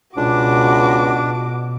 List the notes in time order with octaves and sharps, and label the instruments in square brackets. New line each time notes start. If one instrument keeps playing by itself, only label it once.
[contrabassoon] C#2 [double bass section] B2 [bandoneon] D4 [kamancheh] F#4 D6